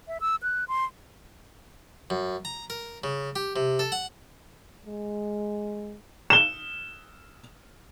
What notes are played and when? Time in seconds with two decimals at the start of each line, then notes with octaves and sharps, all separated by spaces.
0.08 E5
0.21 E6
0.43 F#6
0.68 C6
2.10 F#2
2.45 A#5
2.70 A#4
3.04 C#3
3.36 G4
3.56 C3
3.79 A4
3.92 F#5
4.86 G#3
6.30 E7 G7